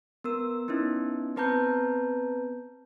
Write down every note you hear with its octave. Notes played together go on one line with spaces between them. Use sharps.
B3 A#4 E6
B3 C#4 D#4 E4
B3 C4 B4 A5 A#5 G6